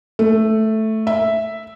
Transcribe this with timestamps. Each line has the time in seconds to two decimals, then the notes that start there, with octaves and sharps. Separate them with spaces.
0.19 A3
1.07 E5